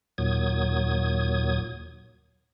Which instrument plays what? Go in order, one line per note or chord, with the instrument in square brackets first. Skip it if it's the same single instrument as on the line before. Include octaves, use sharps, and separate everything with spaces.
[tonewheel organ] D#2 A#2 F#3 D#6 G#6